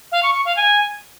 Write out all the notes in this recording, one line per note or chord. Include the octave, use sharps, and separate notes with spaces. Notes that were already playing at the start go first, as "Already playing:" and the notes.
F5
C#6
C#6
F5
G#5